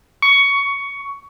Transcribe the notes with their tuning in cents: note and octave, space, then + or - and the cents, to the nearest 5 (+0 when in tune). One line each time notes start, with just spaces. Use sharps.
C#6 +15